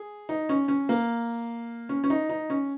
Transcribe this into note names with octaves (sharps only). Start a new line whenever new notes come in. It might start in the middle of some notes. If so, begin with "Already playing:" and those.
Already playing: G#4
D#4
C#4
C#4
A#3
C#4
C#4
D#4
D#4
C#4